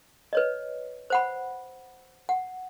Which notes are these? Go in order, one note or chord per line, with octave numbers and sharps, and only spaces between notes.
B4 C#5 D#5
C5 F#5 B5
F#5